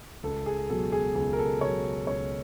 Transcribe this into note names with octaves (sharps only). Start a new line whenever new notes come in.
C#2 A4
G#4
B2 F#3 A4
G#4
C#2 G#4
A#4
A4
B2 F#3 C#5
C#2 C#5